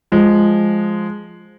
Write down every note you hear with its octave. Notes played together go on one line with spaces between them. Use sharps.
F3 G#3